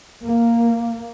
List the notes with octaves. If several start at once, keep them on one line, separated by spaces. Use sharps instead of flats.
A#3